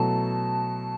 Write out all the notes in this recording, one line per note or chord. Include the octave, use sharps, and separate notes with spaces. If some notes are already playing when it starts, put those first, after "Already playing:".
Already playing: B2 F#3 A3 E4 A4 A5